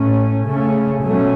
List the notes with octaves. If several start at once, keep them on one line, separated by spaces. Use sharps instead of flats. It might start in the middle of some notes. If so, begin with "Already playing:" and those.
Already playing: A2 A3 C#4
C#3 A3 C#4
B2 F#3 A3 C#4